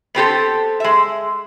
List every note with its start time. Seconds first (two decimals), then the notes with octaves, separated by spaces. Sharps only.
0.15 B3 C4 G4 A4
0.80 G#3 E5